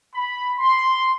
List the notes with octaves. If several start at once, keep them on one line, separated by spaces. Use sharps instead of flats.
B5
C6